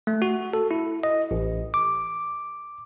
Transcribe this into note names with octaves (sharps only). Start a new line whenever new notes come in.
A3
F#4
A4
E4
D#5
A1
D6